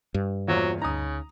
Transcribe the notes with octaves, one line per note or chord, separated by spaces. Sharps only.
G2
E2 A#2 F#3 F4 C5
D2 C#3 D#4 A#5 D#6